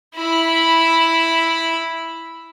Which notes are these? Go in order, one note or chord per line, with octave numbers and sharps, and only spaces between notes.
E4 B5